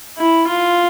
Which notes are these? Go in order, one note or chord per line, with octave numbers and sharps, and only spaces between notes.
E4
F4